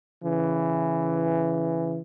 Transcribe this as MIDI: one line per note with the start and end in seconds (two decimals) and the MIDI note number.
0.23 2.00 49
0.23 2.00 52